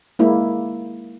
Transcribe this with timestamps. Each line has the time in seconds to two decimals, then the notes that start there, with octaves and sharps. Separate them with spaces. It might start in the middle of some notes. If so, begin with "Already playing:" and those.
0.19 G#3 A#3 E4